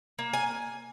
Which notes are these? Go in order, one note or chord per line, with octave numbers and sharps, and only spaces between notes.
A#3
G#5